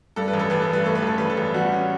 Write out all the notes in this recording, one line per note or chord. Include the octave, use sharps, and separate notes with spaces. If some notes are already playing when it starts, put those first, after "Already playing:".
G2 A4
B4
A1
A4
A1 B4
A4
G2
B4
A3 A4
B4
A1 A4
A1 B4
A4
A1
G3 F#4
C#4